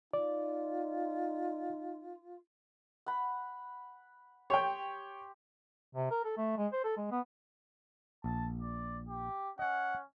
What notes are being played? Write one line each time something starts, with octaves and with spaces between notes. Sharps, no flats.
D#4 F4 D5
F#5 B5
G4 C#5 G5 C6
C3
A#4
A4
A3
G#3
C5
A4
G#3
B3
A#1 A5
D5
G4
C#4 D#5 F#5 G#5